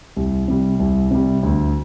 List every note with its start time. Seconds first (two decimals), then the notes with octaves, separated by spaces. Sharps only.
0.16 C2
0.48 C3 G3
0.79 C2
1.11 C3 G3
1.43 D2